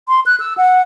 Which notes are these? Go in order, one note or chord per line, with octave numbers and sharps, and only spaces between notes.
C6
F#6
E6
F#5